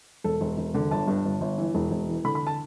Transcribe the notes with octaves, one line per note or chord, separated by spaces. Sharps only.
E1 A4
E1
E1
D3
G1 A5
G2
G1
G1
E3
E1
E1
E3
D3 B5
B5
A5